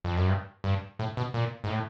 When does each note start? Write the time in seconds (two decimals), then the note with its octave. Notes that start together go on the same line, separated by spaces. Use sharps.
0.04 F2
0.17 F#2
0.29 G2
0.64 G2
0.99 A2
1.17 B2
1.34 A#2
1.64 G#2
1.69 A2